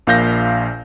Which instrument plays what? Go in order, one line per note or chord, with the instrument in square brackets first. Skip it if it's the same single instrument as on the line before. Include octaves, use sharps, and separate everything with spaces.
[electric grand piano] A#1 A#2 F5 G6 A#6